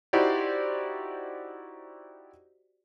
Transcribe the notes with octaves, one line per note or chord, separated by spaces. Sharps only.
D#4 E4 F#4 G4 C5 D5